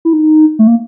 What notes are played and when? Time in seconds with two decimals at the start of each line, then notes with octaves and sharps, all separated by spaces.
0.05 E4
0.13 D#4
0.59 A3
0.67 A#3